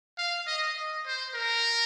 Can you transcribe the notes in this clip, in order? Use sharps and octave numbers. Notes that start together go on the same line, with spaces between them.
F5
D#5
D#5
C5
A#4